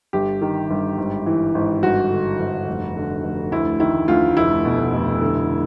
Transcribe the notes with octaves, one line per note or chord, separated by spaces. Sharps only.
G1 G4
D#3
G1
G#1
E3
G#1
G1 F#4
D3
G1
F1
D3
F1
D2 E4
D#3 E4
D2 F4
F1 E4
B2
F1
D3